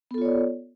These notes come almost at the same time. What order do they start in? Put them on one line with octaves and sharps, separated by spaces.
B3 A4 F4 C#5 D5